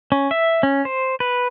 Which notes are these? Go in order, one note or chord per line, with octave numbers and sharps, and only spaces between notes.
C#4
E5
C#4
C5
B4